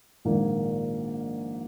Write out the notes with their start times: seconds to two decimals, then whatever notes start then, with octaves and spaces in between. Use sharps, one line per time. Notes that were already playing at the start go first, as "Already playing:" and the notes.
0.25 A#1 G#2 D#3 A#3